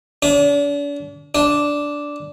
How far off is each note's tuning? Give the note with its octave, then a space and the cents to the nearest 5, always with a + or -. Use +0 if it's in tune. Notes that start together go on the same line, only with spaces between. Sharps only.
D4 -40
D4 -5